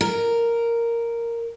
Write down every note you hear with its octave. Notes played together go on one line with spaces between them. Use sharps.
A#4